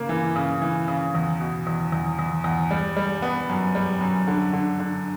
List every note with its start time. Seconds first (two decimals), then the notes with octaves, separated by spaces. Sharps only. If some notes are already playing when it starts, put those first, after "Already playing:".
Already playing: C#3 A#3
0.09 E3
0.36 C#3
0.62 E3
0.88 C#3
1.15 E2
1.40 B2
1.67 E2
1.92 E2
2.19 E2
2.44 E2
2.71 G3
2.97 G3
3.22 B3
3.49 F#2
3.75 G3
4.01 F#2
4.28 D3
4.53 D3
4.80 D3